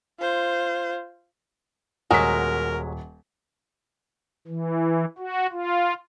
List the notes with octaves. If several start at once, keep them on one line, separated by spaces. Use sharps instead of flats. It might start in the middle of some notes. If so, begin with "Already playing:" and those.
F4 C5
D#1 F#3 G#3 A#4 B6
E3
F#4
F4